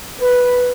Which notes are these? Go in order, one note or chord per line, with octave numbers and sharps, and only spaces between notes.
B4